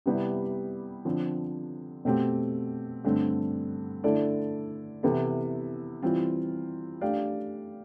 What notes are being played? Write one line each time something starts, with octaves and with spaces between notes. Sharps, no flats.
C3 G3 B3 E4 G4
D3 F3 C4
B2 A3 C4 G4
G2 D3 A3 C4
D3 A3 E4 A4 D5
C3 E3 B3 E4 A4
E3 G3 C4 F4
A3 D4 G4 D5 F5